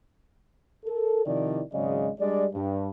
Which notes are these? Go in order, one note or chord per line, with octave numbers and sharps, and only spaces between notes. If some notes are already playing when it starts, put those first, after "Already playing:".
A4 A#4
C3 D#3 F3 E4 D5
G#1 C#3 F#3 G#3 D5 D#5
G3 G#3 D4 D5
G2